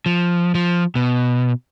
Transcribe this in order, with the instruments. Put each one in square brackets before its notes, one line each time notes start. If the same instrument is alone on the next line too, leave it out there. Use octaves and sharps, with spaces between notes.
[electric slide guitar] F3
F3
B2